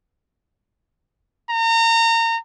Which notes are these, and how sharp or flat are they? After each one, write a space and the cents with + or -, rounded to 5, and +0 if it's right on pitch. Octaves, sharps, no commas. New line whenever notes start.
A#5 -30